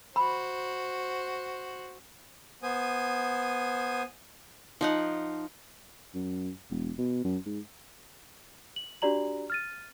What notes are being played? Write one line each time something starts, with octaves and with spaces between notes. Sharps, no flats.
F#4 C5 B5
B3 C5 G#5 D#6
F3 D#4 F#5
F#2
E1
B2
F#2
G#2
F#7
D4 F#4 G4 D5 A#5 F#7
F6 A6 D#7